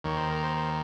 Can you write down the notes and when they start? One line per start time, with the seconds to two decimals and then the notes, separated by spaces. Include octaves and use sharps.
0.04 D#2 D#3 C#5
0.17 C5
0.30 A#4
0.43 C5
0.57 C5